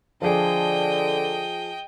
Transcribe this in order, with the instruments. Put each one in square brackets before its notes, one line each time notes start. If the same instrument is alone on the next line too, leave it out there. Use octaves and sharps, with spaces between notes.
[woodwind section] D3 [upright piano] F3 G#4 [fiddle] D#5 G5